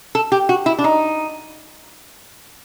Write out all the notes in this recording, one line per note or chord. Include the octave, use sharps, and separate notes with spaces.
A4
G4
F#4
E4
D4
D#4